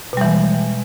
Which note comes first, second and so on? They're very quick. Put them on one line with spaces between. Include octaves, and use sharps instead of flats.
B2 G3 E3 G#3